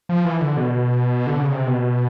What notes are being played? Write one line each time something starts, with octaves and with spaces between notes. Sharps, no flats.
F3
E3
D3
B2
D3
C#3
C3
B2